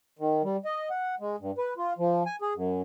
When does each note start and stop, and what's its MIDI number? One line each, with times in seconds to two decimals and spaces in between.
0.19 0.42 51
0.44 0.57 55
0.65 0.89 75
0.90 1.15 78
1.20 1.36 56
1.40 1.51 43
1.58 1.74 71
1.77 1.93 65
1.98 2.23 53
2.26 2.36 80
2.42 2.53 68
2.55 2.82 42